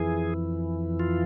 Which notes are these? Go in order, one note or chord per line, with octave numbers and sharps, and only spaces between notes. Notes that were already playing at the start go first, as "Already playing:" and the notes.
Already playing: F2 E3 G#4
F4